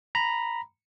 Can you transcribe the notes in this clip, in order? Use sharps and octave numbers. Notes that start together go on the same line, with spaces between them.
A#5 B5